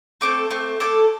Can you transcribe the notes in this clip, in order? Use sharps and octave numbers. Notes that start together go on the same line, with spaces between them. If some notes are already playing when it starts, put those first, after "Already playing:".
A3 C4 A4 D6
A3 C4
A3 C4 A4 D6